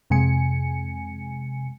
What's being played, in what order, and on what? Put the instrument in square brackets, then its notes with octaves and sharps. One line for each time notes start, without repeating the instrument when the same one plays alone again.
[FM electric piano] F2 C3 G#3 G#5 C#7